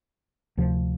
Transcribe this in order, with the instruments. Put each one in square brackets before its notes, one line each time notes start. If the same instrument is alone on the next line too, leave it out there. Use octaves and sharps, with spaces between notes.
[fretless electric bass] D2 C3 F3